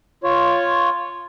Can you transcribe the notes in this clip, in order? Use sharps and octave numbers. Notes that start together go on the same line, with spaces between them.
F4 C#5